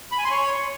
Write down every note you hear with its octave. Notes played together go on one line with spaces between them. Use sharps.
B5
G#5
C6
C#5